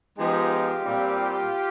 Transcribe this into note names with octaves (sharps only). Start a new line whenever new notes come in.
F3 G#3 B3 D#4 F4 G4
A#2 G3 C4